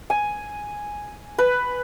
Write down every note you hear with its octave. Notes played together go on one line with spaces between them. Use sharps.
G#5
B4